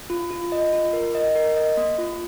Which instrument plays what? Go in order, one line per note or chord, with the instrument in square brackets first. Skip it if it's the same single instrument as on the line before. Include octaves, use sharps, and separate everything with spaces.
[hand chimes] F4
F4
D#5
F4
A#4
D#5
A#4
D#5
A#3
F4